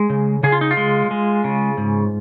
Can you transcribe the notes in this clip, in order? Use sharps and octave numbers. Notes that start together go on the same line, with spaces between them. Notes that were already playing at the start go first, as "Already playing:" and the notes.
Already playing: G#3 G#4
C#3
C#3 G#4
F4
D#4
F4
G#3
G#3
C#3
G#2